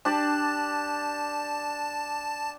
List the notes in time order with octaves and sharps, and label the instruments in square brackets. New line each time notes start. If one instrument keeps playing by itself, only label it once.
[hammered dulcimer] D4 G4 D5 [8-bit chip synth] A5